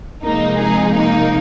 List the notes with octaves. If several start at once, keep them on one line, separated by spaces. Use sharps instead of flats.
C3 F3 G#3 A#3 D#4
D#4 G#4
A#3 D#4